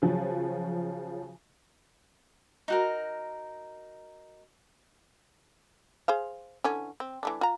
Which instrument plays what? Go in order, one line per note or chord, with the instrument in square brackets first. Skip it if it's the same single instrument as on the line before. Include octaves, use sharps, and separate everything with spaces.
[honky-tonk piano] C#3 F3 F#3
[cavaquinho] D#4 F#4 A#4
[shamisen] G#4 C5 F5
D3 E3 C#4
C4
E3 A3 D4
F4 A#5